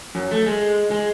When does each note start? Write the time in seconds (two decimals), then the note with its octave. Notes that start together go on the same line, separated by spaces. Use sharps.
0.15 F#2
0.31 A3
0.46 G#3
0.91 G#3